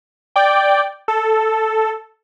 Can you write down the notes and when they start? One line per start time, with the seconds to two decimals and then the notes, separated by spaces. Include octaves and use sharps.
0.36 D5 G5
1.08 A4